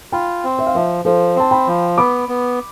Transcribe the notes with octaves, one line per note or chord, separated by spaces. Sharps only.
F4 G5 B5
C4
E5
F5
F3 C5 E5
F3 A4 C5
C4 A5
G5 B5
F3
B3 B5 D6
B3